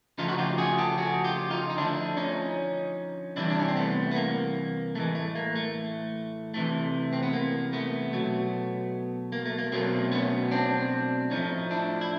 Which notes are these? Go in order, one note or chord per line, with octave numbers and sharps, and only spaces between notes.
C#3 F3 A3 D#4 F4
F#4
F4 G4
F#4 G#4
G4 A4
F#4 G#4
F4 G4
D#4 F4
D#4
D3 F3 A3 D4 E4
C#4 D#4
C3 E3 G3 D4 E4
D4
C#4
C4
A3 B3
B3
A#3
A2 E3 G#3 A3
A3
A#3
A3
C3 E3 A3
C4
B3
A#3
A3 B3
B2 F#3 A3
A#3
A3
A#3
B2 F#3 A3 A#3 C4
B3 C#4
C4 D4
A2 F3 A3 C#4 D#4
D4 E4
E4